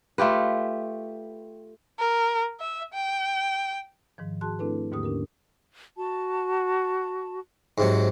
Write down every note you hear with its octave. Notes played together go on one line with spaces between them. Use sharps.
A3 F4 G4 B4
A#4
E5
G5
G#2 D#3 F3
F#4 G#4 A5 C6 F#6
A3 C4 D4 E4 A4 B4
D#2 G#2 D3 A#3 G4 D#6
C#4 D4 G4 A#4
F#4 A5
G#2 C3 F#3